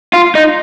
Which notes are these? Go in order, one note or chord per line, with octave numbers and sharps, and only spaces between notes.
F4
D#4